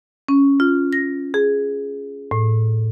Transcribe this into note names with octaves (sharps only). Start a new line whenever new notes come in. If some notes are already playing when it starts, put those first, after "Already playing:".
C#4
F4
A#6
G#4
A2